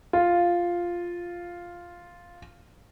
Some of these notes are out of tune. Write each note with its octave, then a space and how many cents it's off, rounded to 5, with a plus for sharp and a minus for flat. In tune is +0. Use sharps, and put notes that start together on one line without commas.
F4 +0